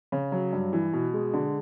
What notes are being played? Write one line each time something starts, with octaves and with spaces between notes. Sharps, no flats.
C#3
F#3
G2
E3
B2
G#3
D3